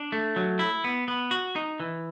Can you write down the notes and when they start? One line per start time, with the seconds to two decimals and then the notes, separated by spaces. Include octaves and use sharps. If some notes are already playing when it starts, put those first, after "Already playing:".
Already playing: D4
0.12 A3
0.36 F#3
0.59 E4
0.84 B3
1.08 B3
1.31 F#4
1.56 D#4
1.80 E3